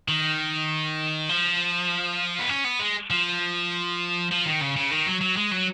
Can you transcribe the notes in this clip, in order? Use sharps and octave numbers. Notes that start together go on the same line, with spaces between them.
D#3
F3
B3
C#4
B3
G#3
F3
F3
D#3
C#3
C#3
D#3
F#3
F#3
G#3
F#3